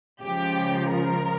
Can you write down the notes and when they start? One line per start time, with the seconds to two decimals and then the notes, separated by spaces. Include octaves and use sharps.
0.23 C#2 C#3 F3 G4
0.90 A#4